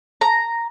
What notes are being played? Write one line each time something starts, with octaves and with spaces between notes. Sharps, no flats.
A#5